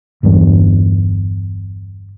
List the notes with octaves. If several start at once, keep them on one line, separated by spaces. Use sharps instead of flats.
G1 E2 G2